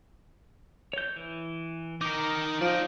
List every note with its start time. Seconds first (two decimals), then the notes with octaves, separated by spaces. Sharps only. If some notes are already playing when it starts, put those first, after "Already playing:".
0.93 C#5 G6
1.16 E3
2.01 D#4 A#4 D6
2.61 F3 D#4 D5